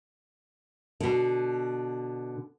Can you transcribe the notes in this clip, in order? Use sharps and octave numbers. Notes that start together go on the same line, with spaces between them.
B2 D3